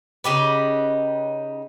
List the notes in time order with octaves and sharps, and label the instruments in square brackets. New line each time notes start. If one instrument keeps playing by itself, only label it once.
[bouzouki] C#3 D#4 G4 B4